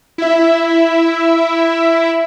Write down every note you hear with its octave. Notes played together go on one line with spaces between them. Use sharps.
E4 E5